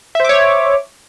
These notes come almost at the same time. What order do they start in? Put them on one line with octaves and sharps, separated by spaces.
E5 C5 D6 C#5